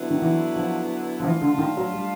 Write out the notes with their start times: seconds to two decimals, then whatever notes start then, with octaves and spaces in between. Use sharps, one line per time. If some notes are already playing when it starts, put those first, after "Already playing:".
Already playing: D3 F#3 B3 E4
0.10 D#3
0.22 E3
0.56 F3
1.20 F3
1.24 E3 A3 D4 F4
1.41 D3
1.54 D3
1.59 D#3
1.77 F#3
1.93 G3